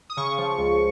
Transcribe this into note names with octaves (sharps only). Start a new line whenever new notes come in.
D#6
C#3 C#6
F3
C#2